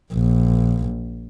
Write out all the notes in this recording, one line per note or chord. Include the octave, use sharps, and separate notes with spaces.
A#1